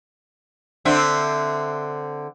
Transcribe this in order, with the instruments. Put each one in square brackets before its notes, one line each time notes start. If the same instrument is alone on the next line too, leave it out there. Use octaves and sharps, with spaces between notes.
[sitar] D3 C4 E5